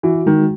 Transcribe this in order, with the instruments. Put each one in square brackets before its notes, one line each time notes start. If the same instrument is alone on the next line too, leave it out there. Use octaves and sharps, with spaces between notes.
[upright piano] E3 [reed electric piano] F#4
[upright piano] D#3 [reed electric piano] G#3